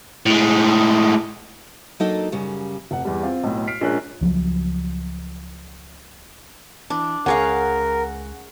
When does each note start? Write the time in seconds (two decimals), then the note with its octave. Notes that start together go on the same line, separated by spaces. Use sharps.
0.26 A2 G#3
2.00 F#3 A#3 D4 D#4 A4 D#5
2.32 F#2 C#3 G3
2.91 F1 F#5
3.05 E2 G3
3.23 C4 F4
3.43 B1 A2
3.67 F6 B6 C7 D7
3.81 A#1 G#3 C#4 A#4 F#6
4.21 C#2 F3 F#3
6.90 E3 D4
7.26 C#2 C#4 G#4 A#4 F5 F#5